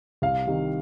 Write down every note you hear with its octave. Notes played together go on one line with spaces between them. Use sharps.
C2 F5
C3 D#3